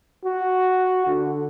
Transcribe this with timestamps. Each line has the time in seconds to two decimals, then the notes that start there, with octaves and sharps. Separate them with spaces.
0.25 F#4
1.07 D3